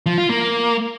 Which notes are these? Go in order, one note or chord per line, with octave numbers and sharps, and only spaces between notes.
F3
F4
A#3